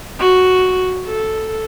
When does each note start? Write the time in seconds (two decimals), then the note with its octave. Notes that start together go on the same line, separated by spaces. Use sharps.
0.20 F#4
1.06 A4